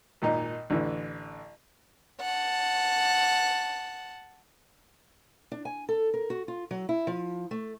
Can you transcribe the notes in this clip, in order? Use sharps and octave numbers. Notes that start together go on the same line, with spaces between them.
G#1 A#2 D#4
A1 D3 E3
F#5 A5
D4
G#5
A4
A#4
F#4
F4
F#3
E4
F3
A3